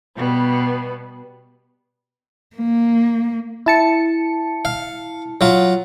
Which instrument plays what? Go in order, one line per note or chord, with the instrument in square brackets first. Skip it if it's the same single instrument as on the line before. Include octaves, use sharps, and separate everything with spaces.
[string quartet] B2 G3 B3
[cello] A#3
[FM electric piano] E4 A5 C#7
[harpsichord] F5
F#3 F4